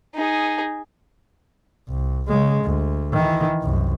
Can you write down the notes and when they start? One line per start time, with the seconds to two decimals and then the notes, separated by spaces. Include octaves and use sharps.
0.14 D#4 G#4
1.89 C2
2.28 C#3 G#3
2.65 D2
3.13 D#3 E3
3.62 C2 F#2